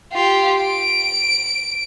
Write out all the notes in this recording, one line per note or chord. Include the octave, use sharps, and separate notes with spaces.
F4 G4
D7